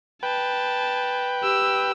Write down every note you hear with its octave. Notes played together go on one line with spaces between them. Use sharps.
B4 G5 A5
G4 E6